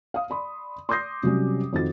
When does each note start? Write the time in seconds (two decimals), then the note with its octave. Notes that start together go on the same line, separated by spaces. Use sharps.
0.14 F5 D#6
0.30 D5 B5 C6
0.89 C6 D6 D#6 G6 A#6 C7
1.23 C3 F#3 G3 C#4
1.73 F2 D#3 F4 F#4 A6